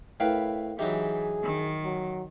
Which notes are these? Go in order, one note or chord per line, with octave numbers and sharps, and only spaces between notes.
A2 E4 A#4 B4 F5 G5
E3 F#3 D#4 G4 G#4 E5
D#3
F#3